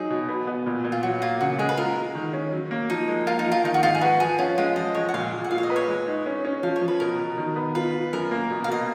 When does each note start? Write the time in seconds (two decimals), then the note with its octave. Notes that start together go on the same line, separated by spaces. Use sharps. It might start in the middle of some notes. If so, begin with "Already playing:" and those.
Already playing: F#3 D#4 G#4
0.10 B2
0.29 B3
0.47 B3
0.66 A#2
0.84 A#2
0.92 F4
1.03 F#3 F#4
1.22 A#3 F4
1.41 C#3 F#4
1.59 G#3 G#4
1.69 B4
1.77 F4 A#4
1.96 F4
2.15 D#3
2.33 C#4
2.52 F#3
2.71 A#3
2.89 F3 D#4
3.08 G#3
3.27 F4 A#4
3.39 D#4
3.46 F3
3.52 F4
3.64 D#3 D#4
3.74 F#4
3.83 G#2 F4
3.95 G#4
4.01 F#4 B4
4.20 F3 G#4
4.39 C#4 F4
4.58 G#3 F4
4.76 F3 D#5
4.95 G#3 C#5
5.09 F#5
5.14 A#2 F5
5.33 A#2
5.44 F#5
5.51 F4 F5
5.58 C#5
5.63 D#5
5.70 B4
5.76 C#5
5.88 G#3
6.07 D#4
6.26 C#4
6.45 C#4
6.63 F3 F5
6.76 C#5
6.81 F3
6.88 B4
7.00 B2 A#4
7.20 B2
7.38 D#3
7.56 B3
7.75 F4 B4
7.94 F4
8.13 F#2 A#4
8.31 A#3
8.50 B2
8.64 F5
8.68 B2 D#5